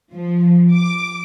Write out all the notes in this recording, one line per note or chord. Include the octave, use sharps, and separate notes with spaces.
F3
D6